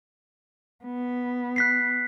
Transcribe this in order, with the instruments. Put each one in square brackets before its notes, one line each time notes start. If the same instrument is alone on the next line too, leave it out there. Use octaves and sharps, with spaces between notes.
[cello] B3
[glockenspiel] F#6 B6 C7